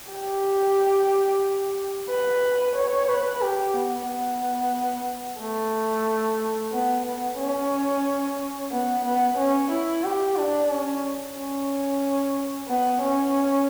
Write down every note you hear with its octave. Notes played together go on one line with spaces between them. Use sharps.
G4
B4
C#5
B4
G4
B3
B3
A3
B3
B3
C#4
B3
B3
C#4
E4
G4
D4
C#4
C#4
B3
C#4